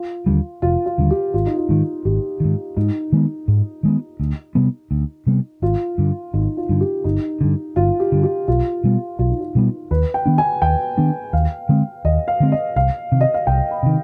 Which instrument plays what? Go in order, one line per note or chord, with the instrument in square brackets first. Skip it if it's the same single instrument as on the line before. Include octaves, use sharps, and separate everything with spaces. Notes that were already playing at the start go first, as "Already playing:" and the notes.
Already playing: [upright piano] F4
[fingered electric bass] D#2 D3 G3
[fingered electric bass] F1 [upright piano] F4
[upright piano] F4
[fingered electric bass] D#2 D3 G3
[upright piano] G4
[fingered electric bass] G#1 [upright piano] F4
[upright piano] D#4
F4
[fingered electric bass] G#2 D#3
[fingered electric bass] G#1 [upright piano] G4
[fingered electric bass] G#2 D#3
[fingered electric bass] G#2 [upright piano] D#4
[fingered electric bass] D#3 G#3 B3
G#2
D#3 G#3 B3
D2
C3 G3 B3
D2
C3 G3 B3
[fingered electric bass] G#1 [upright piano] F4
[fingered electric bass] G2 D3
[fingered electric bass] G#1 [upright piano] D#4
[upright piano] F4
[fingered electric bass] G2 D3
[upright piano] G4
[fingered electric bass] G1 [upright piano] D#4
[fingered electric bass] G2 D3
[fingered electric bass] G1 [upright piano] F4
[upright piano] G4
[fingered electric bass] G2 D3
[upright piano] G4
[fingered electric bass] B1 [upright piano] F4
[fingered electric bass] B2 G3 B3
[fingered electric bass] B1 [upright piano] F4
[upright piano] D#4
F4
[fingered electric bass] B2 G3 B3
[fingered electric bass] D#2 [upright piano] B4
[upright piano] G5
[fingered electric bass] D#3 B3 D4
[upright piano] G#5
[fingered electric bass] D#2 [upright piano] G5
[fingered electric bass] D#3 B3 D4
[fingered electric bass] D#2 [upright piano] F5
[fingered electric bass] D3 G#3 C4
[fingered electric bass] D#2 [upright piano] D#5
[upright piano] F5
[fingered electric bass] D3 G#3 C4
[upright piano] D#5
[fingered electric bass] C2 [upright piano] F5
[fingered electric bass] C3 D#3
[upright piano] D#5
F5
[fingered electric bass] C2 [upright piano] G5
[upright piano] B5
[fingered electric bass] C3 D#3